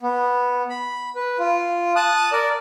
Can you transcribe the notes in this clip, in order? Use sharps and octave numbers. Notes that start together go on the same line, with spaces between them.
B3
B5
B4
F4
A5 D#6 F#6
A#4 D5